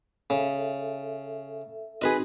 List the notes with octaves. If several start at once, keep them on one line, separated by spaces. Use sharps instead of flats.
C#3 A4 E5
C4 D#4 F#4 G#4 B4 D#5